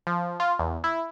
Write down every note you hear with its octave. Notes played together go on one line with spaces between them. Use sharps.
F3
F4
E2
E4